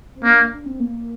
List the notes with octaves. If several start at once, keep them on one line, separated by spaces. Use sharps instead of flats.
C4
A#3 D4
D4
C4
A#3